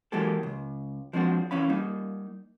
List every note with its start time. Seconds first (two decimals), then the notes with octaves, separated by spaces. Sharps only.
0.12 E3 F#3 G#3 A#3 G4 A4
0.43 C#2
1.13 F3 G#3 C4 D4 F#4
1.51 D#2 E3 C#4 F5 B5
1.69 G3 A#3 D#4